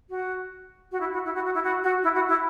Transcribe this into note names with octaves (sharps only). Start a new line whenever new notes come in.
F#4
F#4
E4
F#4
E4
F#4
F#4
E4
F#4
F#4
E4
F#4
E4